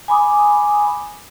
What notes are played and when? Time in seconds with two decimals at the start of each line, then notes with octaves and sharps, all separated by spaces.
0.08 G#5 B5 D6 D#6